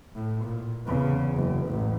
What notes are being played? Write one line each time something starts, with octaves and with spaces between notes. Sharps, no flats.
A2
A#2
E2 C#3
F#1
A1